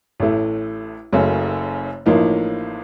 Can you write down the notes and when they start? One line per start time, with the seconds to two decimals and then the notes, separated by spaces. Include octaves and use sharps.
0.20 A1 A2 A3
1.12 F#1 F#2 C#3 A3 C#4
2.06 A1 A2 F3 A#3 D#4